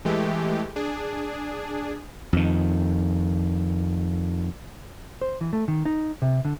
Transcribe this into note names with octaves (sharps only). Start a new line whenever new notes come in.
E3 G#3 A3 G4
D4 G#4
F2 D#3
C5
E3
A3
D#3
D#4
C3
D3